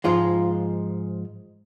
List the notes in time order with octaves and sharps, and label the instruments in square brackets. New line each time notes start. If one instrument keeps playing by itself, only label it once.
[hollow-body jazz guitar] G#2 F3 G#3 F4